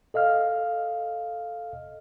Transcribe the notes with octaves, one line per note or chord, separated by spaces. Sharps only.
A4 D#5 F5 F6